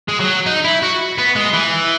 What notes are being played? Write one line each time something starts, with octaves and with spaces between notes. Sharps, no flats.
G#3
F#3
D#4
E4
F#4
B3
G#3
E3